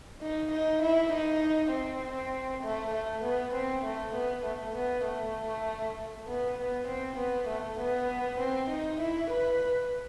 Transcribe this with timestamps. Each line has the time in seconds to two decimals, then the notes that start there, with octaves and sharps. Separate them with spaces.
0.22 D#4
0.51 D#4
0.82 E4
1.12 D#4
1.72 C4
2.63 A3
2.94 A3
3.23 B3
3.54 C4
3.84 A3
4.15 B3
4.45 A3
4.75 B3
5.06 A3
6.27 B3
6.58 B3
6.87 C4
7.17 B3
7.48 A3
7.79 B3
8.39 C4
8.70 D#4
9.00 E4
9.30 B4